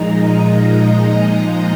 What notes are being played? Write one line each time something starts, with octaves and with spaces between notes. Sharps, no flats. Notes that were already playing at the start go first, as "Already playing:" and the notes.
Already playing: A#2 F3 G#3 D#4 A#5
D#5
D#5